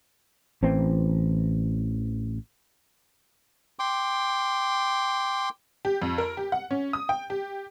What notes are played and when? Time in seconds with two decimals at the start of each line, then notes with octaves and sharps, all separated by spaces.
0.63 A1 E3 C4
3.79 G5 C6 D6
5.85 G4
6.02 F2
6.18 A#4
6.37 G4
6.52 F#5
6.71 C#4
6.93 D#6
7.09 G5
7.30 G4